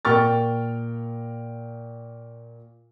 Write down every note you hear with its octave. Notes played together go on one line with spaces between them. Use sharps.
A#2 A#4 G5 C#6 F6 A6